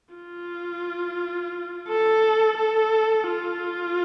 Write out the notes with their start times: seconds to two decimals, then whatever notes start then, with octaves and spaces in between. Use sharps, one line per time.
0.15 F4
1.88 A4
2.57 A4
3.28 F4